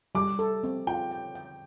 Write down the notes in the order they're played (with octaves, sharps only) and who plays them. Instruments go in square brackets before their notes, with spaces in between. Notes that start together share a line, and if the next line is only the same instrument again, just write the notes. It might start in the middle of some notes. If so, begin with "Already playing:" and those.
[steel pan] G3 [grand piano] D6
[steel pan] A4
C4
[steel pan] F4 [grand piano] G5
[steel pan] G5
G5